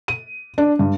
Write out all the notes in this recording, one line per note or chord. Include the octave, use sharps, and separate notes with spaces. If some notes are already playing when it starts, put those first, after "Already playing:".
D#7
D4
G2